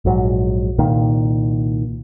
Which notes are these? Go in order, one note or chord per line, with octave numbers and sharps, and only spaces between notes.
A#1 G#2 F#3
C2 A#2 D#3